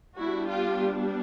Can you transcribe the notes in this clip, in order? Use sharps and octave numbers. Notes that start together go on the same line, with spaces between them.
G3 B3 D4 E4 F#4
F4 G4